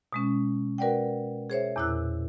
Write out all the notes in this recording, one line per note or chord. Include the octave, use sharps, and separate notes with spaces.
B2 G#3 C#4
F#4 A#4 B4 D5 F#5 G5
G#4 C5 C#5 E5
E2 A#2 E4 E6 F#6